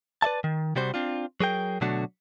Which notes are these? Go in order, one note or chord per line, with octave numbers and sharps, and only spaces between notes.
B4 D5 E5 A5
D#3
C3 G3 C4 F#4 C5
C4 D4 F4
F#3 G#4 A#4 G5
B2 D3 F#3 A3 D4 F#4